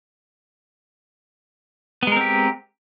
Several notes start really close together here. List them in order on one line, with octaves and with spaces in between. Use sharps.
B3 G#3 A#4 C4 G4